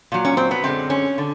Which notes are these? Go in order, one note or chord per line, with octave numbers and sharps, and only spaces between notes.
A#2 F#3
C#4
C4
B3
F#2 D3 F3 G#3 C4
C#4
D3